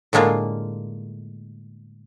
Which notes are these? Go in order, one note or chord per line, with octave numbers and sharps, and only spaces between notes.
A2 D3 G#3 A#3 F4